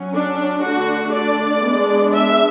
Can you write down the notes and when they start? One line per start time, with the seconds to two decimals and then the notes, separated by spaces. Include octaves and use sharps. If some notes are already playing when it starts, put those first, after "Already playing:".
Already playing: F#3 C#4
0.13 D4
0.63 D3 A3 D4 F#4
1.13 D5
1.63 G#3 B3 D4
2.14 E5